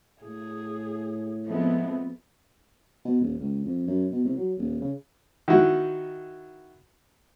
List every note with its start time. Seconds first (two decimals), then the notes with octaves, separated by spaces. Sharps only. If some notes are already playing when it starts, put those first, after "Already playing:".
0.22 A2 G#4
1.46 F3 G#3 A3 B3 C4
3.05 B2
3.21 D#1
3.40 C#2
3.65 F2
3.87 F#2
4.11 B2
4.24 C2
4.37 F#3
4.58 D#1
4.81 C#3
5.48 D#3 E4 F#4